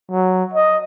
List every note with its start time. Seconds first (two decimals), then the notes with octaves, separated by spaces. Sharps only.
0.11 F#3
0.54 D#5